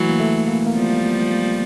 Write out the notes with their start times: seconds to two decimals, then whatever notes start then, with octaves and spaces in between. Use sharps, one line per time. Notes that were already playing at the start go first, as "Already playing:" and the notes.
Already playing: E3 F#3 A3
0.09 A#3
0.20 A3
0.47 A#3
0.66 A#3
0.75 F3 G3 B3